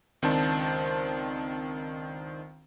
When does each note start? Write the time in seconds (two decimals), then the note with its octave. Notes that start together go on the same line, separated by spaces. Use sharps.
0.22 C#2 D#3 C4 D4 C5 A5